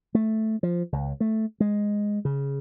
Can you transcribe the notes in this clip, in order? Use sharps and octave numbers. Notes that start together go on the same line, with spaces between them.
A3
F3
C#2
A3
G#3
C#3